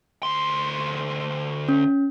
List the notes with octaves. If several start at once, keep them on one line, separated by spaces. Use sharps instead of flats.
D2 C6
C#4